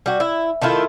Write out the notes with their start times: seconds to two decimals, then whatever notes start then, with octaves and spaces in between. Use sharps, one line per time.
0.06 G3 F#4
0.20 E4
0.62 D#3 A3 E4 F4